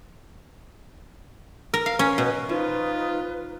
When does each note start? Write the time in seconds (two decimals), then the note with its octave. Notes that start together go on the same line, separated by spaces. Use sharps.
1.74 A#4
1.86 F5
1.99 C#4
2.18 B2
2.49 F3 D#4 F4 B4